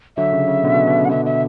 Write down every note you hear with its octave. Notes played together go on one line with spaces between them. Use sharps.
D3 F#3 E5
C#3
C#3
B2 D3
B2
B2
C#3
F#5
B2 D3 E5
E5